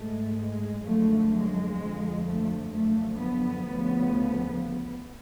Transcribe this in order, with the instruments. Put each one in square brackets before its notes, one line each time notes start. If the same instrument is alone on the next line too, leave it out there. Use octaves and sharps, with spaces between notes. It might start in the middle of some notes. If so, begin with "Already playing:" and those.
Already playing: [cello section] G#2 G#3 A3
G#3
F#2 D3 F3 G#3 A3
G#3
F2 D3 F3
A3
F#2 D3 F3 A3
B3
D2 C#3 F3